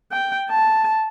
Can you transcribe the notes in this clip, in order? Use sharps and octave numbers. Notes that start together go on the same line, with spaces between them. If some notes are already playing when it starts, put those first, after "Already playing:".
G5
A5